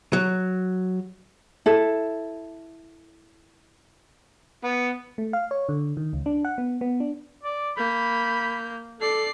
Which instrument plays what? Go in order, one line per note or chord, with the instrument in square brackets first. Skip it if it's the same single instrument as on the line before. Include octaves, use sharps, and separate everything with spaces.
[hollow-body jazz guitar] F#3
[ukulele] E4 A4
[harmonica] B3
[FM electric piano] A3
F5
C#5
D3
D#3
C#2
D4
F#5
B3
B3
D4
[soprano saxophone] D5
[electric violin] A#3 G6 [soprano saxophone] B5
[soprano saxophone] A4 [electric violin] D5 C7